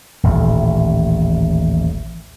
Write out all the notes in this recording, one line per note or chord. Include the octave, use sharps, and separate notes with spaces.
D#1 A1